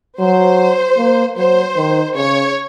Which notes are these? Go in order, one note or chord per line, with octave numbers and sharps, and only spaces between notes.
F#3 C5
A#3
F#3 C5
D#3
C#3 C#5